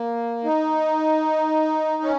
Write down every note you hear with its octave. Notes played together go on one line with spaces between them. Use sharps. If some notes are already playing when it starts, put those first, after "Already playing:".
Already playing: A#3
D#4
C#4